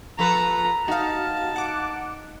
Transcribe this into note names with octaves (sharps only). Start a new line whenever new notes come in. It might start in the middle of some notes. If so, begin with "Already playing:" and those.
F3 A4 B4 A#5
D#4 F#4 F5 A5
F#5 D6